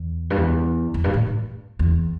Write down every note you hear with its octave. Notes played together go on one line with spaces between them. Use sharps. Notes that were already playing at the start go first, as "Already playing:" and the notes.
Already playing: E2
G2
E2
E2
G2
A2
E2